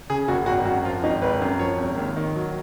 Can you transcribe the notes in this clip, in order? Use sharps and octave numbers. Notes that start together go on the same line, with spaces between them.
C#3 G#4
F#1 F#4
G#1 F#4
F#2 F#4
F3 F4
G#1 D#4
G#1 B4
F#2
F3 C#5
G#1
D#2
D#3
F#3